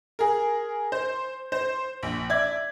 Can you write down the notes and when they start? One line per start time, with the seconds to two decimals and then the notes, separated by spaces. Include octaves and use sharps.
0.19 G#4 A#4
0.92 C5
1.52 C5
2.03 A#1
2.30 D5 E5 G#6